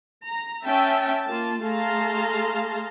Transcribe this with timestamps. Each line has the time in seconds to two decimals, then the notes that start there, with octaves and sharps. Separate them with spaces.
0.25 A#5
0.64 C#4 E5 G5 A5
1.25 A#3 F4 A5
1.64 A3 G#4 F5 A5 A#5 C6